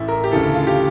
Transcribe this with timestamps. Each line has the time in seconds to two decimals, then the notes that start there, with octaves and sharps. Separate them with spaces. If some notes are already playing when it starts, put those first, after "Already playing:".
Already playing: A1 A2 E3 E5
0.08 A#4
0.24 G4
0.32 D2 C#3 E3 A4
0.54 F4
0.67 G4